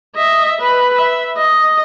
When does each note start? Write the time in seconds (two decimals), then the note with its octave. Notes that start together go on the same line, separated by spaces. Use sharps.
0.16 D#5 E5
0.61 B4
0.97 E5
1.37 D#5